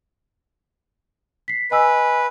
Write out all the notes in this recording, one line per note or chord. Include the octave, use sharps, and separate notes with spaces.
B6 C7
B4 D#5 G#5 E6